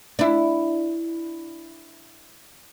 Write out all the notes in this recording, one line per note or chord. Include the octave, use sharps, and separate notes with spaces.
D4 E4